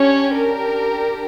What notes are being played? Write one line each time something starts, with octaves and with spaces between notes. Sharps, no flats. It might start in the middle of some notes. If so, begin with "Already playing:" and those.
Already playing: C#4 D4 G4 C#5
A#4